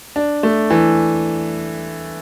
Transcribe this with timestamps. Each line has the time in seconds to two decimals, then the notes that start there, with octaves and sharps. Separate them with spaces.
0.16 D4
0.43 A3
0.70 E3